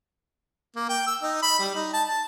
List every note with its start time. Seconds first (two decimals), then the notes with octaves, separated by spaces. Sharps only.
0.76 A#3
0.89 G5
1.07 E6
1.22 D#4
1.43 B5
1.59 G3
1.75 D#4
1.94 A5
2.08 A5